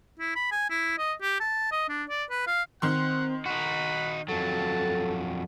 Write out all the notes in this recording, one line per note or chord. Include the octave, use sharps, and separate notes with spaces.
E4
B5
G#5
E4
D#5
G4
A5
D#5
D4
D5
B4
F5
D#3 C4 F#5 C6
D#4 F#4 B5 F#6
F2 F#3 A4 A5